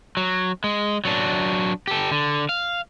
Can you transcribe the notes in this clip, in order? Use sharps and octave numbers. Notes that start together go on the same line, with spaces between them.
F#3
G#3
F#3 D4
G4 A4
D3
F5